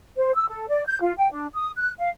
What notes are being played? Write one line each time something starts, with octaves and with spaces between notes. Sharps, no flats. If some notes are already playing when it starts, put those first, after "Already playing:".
C5
E6
A4
D5
G6
F4
G5
D4
D#6
F#6
F5